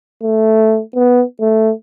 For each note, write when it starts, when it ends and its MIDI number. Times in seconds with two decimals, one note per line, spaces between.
0.22 0.81 57
0.95 1.23 59
1.40 1.72 57